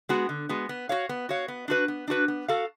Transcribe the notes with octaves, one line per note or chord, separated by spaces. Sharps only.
G#3 B3 F#4
D3
G#3 B3 F#4
B3
F#4 C#5 F5
B3
F#4 C#5 F5
B3
D4 F#4 B4
B3
D4 F#4 B4
B3
F#4 A4 F5